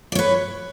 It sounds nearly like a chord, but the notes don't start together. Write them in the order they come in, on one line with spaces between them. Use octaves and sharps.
D5 C#5 B4